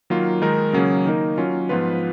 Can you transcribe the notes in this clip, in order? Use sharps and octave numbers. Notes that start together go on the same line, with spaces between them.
D#3 F#3 A#3 F4
D#3 G#3 D#4 A#4
C#3 F#3 A#3 C#4 G#4
D#3 A#3 D#4 A#4
F#3 C#4 F4
G#2 F3 B3 F4 B4